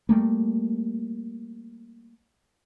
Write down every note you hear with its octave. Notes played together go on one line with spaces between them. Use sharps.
G3 A3 A#3